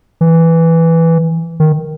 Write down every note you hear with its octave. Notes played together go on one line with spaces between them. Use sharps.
E3
D#3